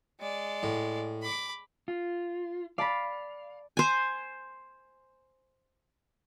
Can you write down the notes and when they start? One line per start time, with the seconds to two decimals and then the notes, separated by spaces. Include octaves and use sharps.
0.20 G#3 D5
0.63 A2
1.22 B5 D6
1.88 F4
2.78 D5 F5 A5 B5
3.77 C5 G#5